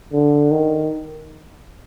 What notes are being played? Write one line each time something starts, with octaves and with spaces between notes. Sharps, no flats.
D3
D#3